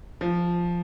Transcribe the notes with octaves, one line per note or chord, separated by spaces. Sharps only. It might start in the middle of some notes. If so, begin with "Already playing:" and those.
F3